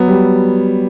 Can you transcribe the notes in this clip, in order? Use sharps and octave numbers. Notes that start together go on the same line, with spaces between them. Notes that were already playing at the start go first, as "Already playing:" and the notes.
Already playing: F#3 B3
G3